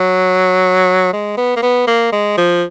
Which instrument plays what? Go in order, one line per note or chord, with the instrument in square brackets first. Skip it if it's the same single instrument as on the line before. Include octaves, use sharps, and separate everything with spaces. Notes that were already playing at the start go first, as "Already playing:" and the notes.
Already playing: [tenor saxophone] F#3
G#3
B3
A#3
B3
A#3
G#3
F3